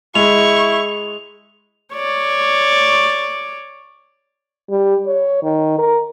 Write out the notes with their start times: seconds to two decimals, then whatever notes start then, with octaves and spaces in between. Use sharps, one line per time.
0.15 G#3 E4 C#6 F7
1.94 C#5 D5
4.70 G3
5.07 C#5
5.43 D#3
5.79 A#4